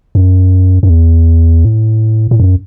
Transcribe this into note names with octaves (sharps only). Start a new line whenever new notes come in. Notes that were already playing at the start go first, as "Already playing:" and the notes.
F#2
F#2
E2
A2
A2
F#2